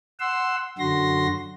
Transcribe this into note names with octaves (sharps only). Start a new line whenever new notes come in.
F#5 C6 E6
F#2 D3 F#4 C6 A#6